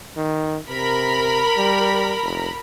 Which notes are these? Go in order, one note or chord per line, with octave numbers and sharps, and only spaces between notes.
D#3
C3 A#4 B5
G3
F1